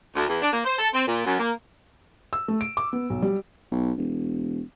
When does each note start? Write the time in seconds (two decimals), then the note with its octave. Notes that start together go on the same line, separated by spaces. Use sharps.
0.16 D2
0.28 E2
0.41 D4
0.53 A#3
0.65 C5
0.79 A4
0.94 C4
1.07 A#2
1.25 F#2
1.38 A#3
2.33 E6
2.48 A3
2.61 D7
2.77 D6
2.93 B3
3.10 B1
3.22 G3
3.71 B1
3.98 E1